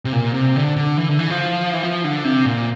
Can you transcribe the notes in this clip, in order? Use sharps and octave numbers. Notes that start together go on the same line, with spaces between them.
C3
A#2
C3
D3
D3
E3
D3
E3
F3
E3
F3
D3
C3
A#2